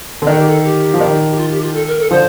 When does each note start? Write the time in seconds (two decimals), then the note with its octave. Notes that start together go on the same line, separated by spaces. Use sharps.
0.22 D3
0.27 D#3 A4
0.37 G4
0.47 A4
0.64 G4
0.94 F3
1.01 D#3
1.30 G4
1.37 F4
1.50 G4
1.62 F4
1.74 A4
1.87 A#4
1.99 A4
2.11 D3 F3 C5